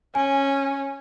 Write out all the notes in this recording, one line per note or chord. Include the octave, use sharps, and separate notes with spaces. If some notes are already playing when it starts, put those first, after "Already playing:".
C#4 G#5